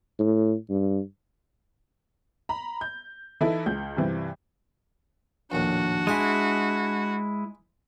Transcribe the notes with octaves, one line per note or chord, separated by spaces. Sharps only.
A2
G2
A#5 B5
G6
E3 D#4 E4 A4 B4
C#2 G6
G2 C3 E3
A#1 D#2 A2 D4 F#4
G#3 E4 G#5 C6